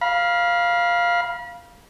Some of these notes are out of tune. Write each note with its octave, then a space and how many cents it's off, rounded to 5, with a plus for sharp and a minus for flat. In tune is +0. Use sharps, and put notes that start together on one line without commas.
F5 +0 B5 -40